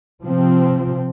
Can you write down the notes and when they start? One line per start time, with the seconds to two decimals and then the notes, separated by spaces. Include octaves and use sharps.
0.23 C3 F3 C4